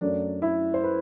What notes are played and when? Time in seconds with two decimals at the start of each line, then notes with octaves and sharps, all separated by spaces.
0.01 F#2 F#3 A3 D4
0.42 E4
0.74 C5
0.84 B4